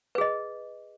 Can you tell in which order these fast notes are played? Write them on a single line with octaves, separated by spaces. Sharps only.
B4 G#4 D#5